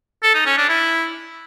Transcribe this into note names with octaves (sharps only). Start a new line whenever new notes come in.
A4
D#4
C#4
D4
E4